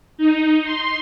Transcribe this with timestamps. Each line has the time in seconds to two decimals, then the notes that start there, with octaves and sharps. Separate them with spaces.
0.17 D#4
0.64 C6